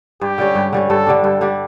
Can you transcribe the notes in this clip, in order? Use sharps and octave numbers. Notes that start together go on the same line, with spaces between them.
G2 G4
D3 G3 C#4
G2
D3 G3 C#4
G2 A4
D3 G3 D4
G2 A4
D3 G3 D4